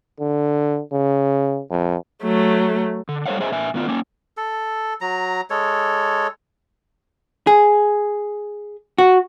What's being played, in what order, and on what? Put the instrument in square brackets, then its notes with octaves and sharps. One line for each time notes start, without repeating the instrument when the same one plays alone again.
[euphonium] D3
C#3
F2
[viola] F#3 A3
[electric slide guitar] D3
G3 A4 C5 C#5 F5 F#5
G#4 C5 D#5 E5 G#5
A#2 E5 G#5
A2 D#3 B3 F4
A#3 C#4
[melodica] A4
F#3 A#5
G#3 A4 C#5
[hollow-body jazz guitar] G#4
F#4